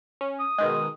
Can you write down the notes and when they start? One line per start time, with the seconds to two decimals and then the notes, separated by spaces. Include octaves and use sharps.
0.21 C#4
0.39 D#6
0.58 B2 D#3 G#3